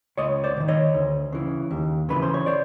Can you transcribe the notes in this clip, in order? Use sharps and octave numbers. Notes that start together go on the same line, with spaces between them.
C#2 C#5 D#5
C5 D5
C3
D#3
C#5 D#5
D2
C#3 E3
D#2
C#3 E3 B4
C5
C#5
C5 D5